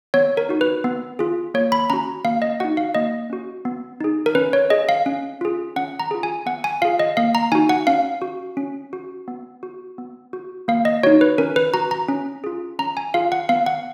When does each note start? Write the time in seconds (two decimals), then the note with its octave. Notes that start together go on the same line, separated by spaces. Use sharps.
0.14 B3 C#5
0.37 A#4
0.49 D#4 F#4
0.61 B4
0.84 B3
1.19 F4 G#4
1.54 A#3 C#5
1.72 B5
1.90 C#4 F#4 A#5
2.25 A#3 F5
2.42 D#5
2.60 D#4 F#4 F#5
2.77 F5
2.95 A#3 D#5
3.30 C#4 F#4
3.65 B3
4.01 D#4 G#4
4.26 A#4
4.35 C#4 B4
4.53 C#5
4.70 G#4 D#5
4.89 F5
5.06 C#4
5.41 F4 G#4
5.76 C#4 F#5
5.99 A#5
6.11 F4 G#4
6.23 G#5
6.46 B3 F#5
6.64 G#5
6.82 F4 F5
6.85 G#4
6.99 D#5
7.17 A#3 F5
7.35 A#5
7.52 D#4 F#4 G#5
7.69 F#5
7.87 C#4 F5
8.22 F#4
8.57 C#4
8.93 F#4
9.28 B3
9.63 F#4
9.98 B3
10.33 F#4
10.68 A#3 F5
10.85 D#5
11.03 D#4 F#4 C#5
11.21 B4
11.38 C#4 A#4
11.56 B4
11.74 F#4 A#5
11.91 A#5
12.08 C#4
12.44 F4 G#4
12.79 C#4 A#5
12.97 G#5
13.14 F4 G#4 F5
13.32 F#5
13.49 B3 F5
13.66 F#5